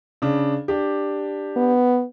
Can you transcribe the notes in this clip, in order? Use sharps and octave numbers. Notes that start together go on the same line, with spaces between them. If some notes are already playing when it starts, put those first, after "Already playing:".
C#3 D4
D4 G4
B3